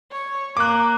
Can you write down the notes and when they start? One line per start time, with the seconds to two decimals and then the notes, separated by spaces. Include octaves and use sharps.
0.12 C#5
0.57 A#3 D6 F#6